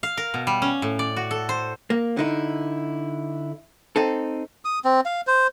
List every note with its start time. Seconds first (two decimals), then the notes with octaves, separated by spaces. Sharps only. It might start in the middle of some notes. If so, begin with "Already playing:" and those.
0.03 F5
0.17 A#4
0.34 B2
0.47 G3
0.62 C#4
0.82 A2
0.99 D5
1.16 F#4
1.31 A4
1.49 C5
1.90 A#3
2.17 D3 D#4 E4
3.96 C4 D#4 A4
4.65 D#6
4.85 C4
5.06 F5
5.27 C5